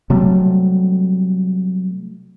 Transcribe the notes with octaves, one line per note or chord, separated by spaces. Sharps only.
C3 F#3 G3 A3